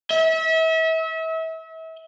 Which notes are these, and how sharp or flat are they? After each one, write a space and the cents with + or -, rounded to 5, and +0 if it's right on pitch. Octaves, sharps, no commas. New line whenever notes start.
E5 -35